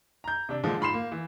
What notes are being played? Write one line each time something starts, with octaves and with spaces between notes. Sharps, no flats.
A#5 G6
C3 D4
A#2 D3 F3 G#3
G#2 F4 B5 C6 C7 E7
A#3
E3